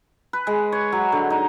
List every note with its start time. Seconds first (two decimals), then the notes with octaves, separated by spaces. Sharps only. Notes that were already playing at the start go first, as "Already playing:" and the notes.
0.33 B4
0.47 G#3
0.72 C#5
0.92 F#3
1.12 D3
1.30 D#4